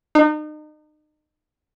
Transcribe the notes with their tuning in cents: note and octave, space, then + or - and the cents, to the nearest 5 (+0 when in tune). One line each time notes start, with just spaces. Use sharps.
D#4 -35